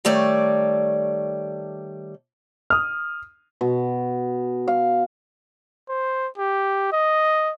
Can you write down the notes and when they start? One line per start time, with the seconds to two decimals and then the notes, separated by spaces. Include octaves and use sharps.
0.05 D#3 G3 A3 C#5 D5
2.70 D#6 F6
3.61 B2
4.68 F5
5.89 C5
6.38 G4
6.92 D#5